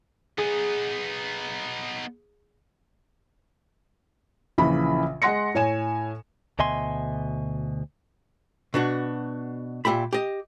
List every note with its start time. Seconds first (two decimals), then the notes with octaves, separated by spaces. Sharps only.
0.38 B3 D#4 G#4
4.58 A#1 C#3 E3 B5
5.22 G#3 F#5 C6 A#6 C#7
5.54 A2 C#5 G#5 E7
6.59 D2 B2 D#5 E5 G#5 C6
8.74 B2 D4 F#4
9.85 A#2 G4 E5 B5
10.13 G4 D#5